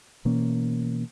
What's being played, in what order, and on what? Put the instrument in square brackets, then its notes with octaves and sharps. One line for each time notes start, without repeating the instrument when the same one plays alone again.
[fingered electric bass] B2 E3 A#3 C#4